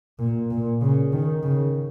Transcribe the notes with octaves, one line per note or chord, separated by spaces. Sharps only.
A#2
A#2
C#3
D#3
C#3